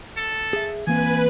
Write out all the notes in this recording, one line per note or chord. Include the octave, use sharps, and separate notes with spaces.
A4
G#4 E5
E3 A#3 C4 B4 G#5